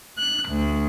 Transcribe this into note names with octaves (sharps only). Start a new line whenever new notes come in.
F#6
D2